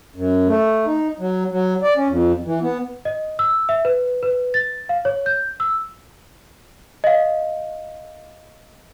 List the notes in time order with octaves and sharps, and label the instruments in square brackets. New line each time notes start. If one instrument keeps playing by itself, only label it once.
[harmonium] F#2
A3
D#4
F#3
F#3
D5
C#4
F2
E3
B3
[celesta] D#5
E6
E5
B4
B4
A6
F5
C#5
G6
E6
D#5 F5